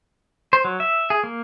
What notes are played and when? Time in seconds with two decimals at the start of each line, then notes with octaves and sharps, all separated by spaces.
0.53 C5
0.64 F#3
0.80 E5
1.10 G#4
1.24 A#3